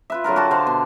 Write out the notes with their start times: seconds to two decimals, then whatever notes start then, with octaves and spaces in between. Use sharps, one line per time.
0.10 F4 B4 E5
0.24 D3 F#3 F4 A#4
0.36 F#4 G4 F#5 A5
0.51 D3 C5 F5
0.67 B2